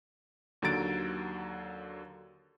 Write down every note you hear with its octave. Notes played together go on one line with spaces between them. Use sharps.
D#2 D3 F#3 A#5 A6 D7